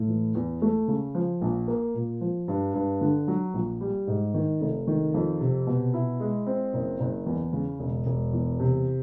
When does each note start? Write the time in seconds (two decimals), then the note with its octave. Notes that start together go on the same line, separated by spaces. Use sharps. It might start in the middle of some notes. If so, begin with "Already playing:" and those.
Already playing: A2
0.08 E3
0.35 E2
0.62 A3
0.88 C#3
1.15 F3
1.41 A#1
1.68 A#3
1.95 A#2
2.21 F3
2.48 G2
2.74 G2
3.01 D3
3.28 F#3
3.54 A#1
3.81 G3
4.07 G#2
4.34 D#3
4.61 F1
4.87 D#3
5.14 F2
5.40 C3
5.67 B2
5.94 E4
6.20 G#3
6.46 C4
6.73 F#1
7.00 F#1
7.26 E2
7.53 C#3
7.80 E1
8.06 E1
8.33 E2
8.59 C3